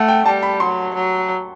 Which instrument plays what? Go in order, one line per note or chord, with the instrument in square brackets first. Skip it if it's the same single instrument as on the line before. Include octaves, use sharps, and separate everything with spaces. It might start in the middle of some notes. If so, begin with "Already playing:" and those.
Already playing: [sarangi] A3 [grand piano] F#5
[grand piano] G5
[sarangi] G3 [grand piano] A5
[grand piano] B5
[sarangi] F#3 [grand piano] C6
[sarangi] F#3